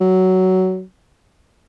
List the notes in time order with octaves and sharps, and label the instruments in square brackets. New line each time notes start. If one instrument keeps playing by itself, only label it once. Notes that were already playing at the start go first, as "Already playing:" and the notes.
[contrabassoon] F#3